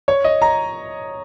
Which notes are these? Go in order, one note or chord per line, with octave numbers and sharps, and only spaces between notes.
C#5
D#5
A#5